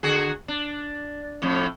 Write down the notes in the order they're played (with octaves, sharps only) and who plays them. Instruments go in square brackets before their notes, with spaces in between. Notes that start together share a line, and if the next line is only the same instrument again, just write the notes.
[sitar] D3 F#4 G#4
D4
F2 A2